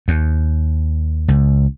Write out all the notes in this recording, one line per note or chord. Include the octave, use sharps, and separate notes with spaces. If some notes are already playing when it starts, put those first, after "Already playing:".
D#2
C#2